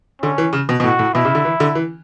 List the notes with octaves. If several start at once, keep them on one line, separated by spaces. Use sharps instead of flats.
D3 C#4
E3
C#3
B2
B2
A2 F#4
A2
B2 E4
C#3
D3
E3
D3
E3